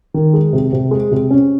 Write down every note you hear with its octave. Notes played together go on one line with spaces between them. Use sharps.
D#3
G#3
C3
C3
G#3
C3
C#4